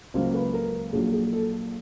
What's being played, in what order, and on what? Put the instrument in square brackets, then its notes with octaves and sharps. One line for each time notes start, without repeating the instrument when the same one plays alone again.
[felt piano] C#2 C#3 F#3 A#3 C5
B4
A#4
A#1 A#2 F#3 G#4
G#4
A4